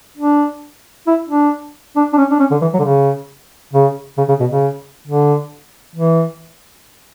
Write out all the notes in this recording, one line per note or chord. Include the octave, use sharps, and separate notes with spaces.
D4
E4
D4
D4
D4
C#4
D4
C#4
D3
E3
F#3
D3
C#3
C#3
C#3
C#3
B2
C#3
D3
E3